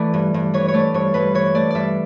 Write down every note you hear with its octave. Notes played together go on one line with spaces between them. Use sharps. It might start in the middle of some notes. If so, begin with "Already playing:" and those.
Already playing: E3 A3 D5
G2
G2
E3 C#5
C#5
A3 D5
G2 C#5
G2 B4
E3 C#5
A3 D5
G2 D5 E5